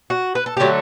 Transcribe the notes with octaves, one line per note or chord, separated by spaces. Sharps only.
F#4
B4
A4
D3 F#3 A3 G4